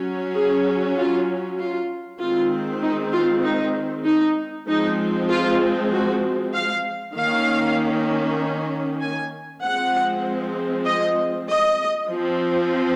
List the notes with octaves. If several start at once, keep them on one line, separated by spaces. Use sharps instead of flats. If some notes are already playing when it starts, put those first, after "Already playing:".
Already playing: F#3 C#4
G#4
F4
F4
D#3 G#3 C4 F4
D#4
F4
D#4
D#4
F3 G#3 C4 D#4
F4
F#4
F5
D#3 A#3 C#4 F5
G#5
F3 G#3 C4 F#5
D#5
D#5
F3 C4